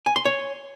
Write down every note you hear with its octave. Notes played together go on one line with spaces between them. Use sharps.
G#5
C6
C#5